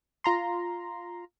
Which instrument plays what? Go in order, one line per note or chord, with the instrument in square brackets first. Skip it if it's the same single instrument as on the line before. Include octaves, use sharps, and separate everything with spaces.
[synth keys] F4 A#5 C6